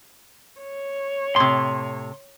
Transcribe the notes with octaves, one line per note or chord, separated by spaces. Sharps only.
C#5
A2 C3 C6